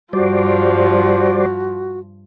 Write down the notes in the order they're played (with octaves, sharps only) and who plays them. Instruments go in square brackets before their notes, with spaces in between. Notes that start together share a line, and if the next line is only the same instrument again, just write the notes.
[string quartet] G2 F3 [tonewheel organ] G3 C5 D5 [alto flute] F#4